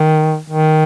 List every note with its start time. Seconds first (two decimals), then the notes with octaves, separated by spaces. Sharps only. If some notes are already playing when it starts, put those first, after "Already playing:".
Already playing: D#3
0.50 D#3